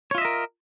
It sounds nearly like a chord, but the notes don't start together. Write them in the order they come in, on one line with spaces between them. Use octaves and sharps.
C#5 F4 E5 D#5 A#4